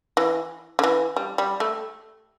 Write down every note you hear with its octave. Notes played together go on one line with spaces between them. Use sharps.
E3
D3
E3
G3
G3
A3